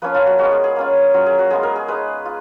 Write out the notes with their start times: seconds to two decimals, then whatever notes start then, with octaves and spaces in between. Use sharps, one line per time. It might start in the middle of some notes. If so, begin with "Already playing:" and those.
0.02 F3 A#3 C#4 F4 B4
0.14 F4
0.26 F#4
0.39 G#3 B3 F4 F#4
0.52 G#4
0.64 G#4
0.76 A#3 C#4 F4
1.14 F#3 C#4 F4
1.26 G#4
1.39 F#4
1.50 G#3 B3 F4 G#4
1.63 A#4
1.76 G#4
1.88 G#3 D#4 B4
2.25 F4